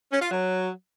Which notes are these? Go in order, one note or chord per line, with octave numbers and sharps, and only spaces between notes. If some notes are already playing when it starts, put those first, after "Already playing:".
C#4
F4
F#3